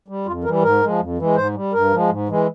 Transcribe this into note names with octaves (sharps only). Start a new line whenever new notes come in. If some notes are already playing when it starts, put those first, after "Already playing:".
G3
F2 F4
E3 G3 A#4
G#2 A#4
F3 G#3
F2
E3 G#3
G#2 C5
G3
G2 A#4
F3 G#3
G#2
E3 G#3